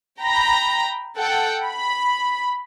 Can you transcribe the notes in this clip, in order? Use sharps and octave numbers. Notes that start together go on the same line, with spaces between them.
G5 A#5 B5 A#6
A4 F#5 G5
B5